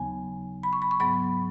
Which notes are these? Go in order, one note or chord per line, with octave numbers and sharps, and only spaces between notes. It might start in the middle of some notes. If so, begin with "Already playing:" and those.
Already playing: D#2 C#3 F#3 B3 G#5
B5
C#6
B5
C#6
G#2 F#3 B3 B5